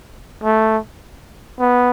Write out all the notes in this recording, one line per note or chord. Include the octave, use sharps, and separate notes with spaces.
A3
B3